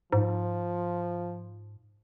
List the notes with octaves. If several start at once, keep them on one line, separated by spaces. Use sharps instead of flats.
G#2 F3